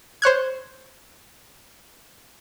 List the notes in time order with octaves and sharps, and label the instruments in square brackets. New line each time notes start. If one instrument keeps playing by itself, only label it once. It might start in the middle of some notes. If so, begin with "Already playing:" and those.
[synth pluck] C5 C#5 F#6 G#6